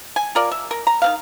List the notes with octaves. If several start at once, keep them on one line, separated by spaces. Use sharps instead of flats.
G#5
F4 A#4 D5
E5
A#4
A#5
D#3 C4 F5